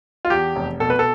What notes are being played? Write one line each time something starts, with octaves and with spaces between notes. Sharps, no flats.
F4
E2 G4
F1
B2 A4
B4
A4